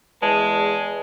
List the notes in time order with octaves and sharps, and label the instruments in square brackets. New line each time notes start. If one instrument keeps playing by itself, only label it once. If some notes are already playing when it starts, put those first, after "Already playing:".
[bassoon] E2 [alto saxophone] G#3 [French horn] B4 [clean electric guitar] A5